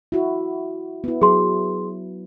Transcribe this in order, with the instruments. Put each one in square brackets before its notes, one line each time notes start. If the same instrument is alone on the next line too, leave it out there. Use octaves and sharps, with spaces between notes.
[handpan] E4 F#4
B3 E4
[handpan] F#3 [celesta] G#4 C6